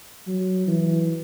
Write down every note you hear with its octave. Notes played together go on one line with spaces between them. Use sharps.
F#3
E3